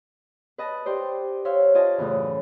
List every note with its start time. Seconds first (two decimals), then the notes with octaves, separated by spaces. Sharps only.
0.58 B4 D#5 A5
0.86 G4 C5 D5
1.45 C5 C#5 E5 F5
1.75 F4 D5 D#5 G#5 A5
1.98 F#2 A2 C#3 E3